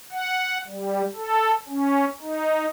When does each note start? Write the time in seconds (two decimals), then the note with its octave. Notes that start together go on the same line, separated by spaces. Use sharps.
0.12 F#5
0.67 G3
1.15 A4
1.68 C#4
2.20 D#4